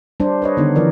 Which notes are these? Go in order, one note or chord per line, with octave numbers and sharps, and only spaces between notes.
G3 D4 C5
B4 C#5 D#5
D3 D#3 B3 D#4
E3 F3 A#4 D5